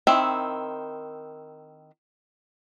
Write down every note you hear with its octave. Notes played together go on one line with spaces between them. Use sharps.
D#3 C4 E4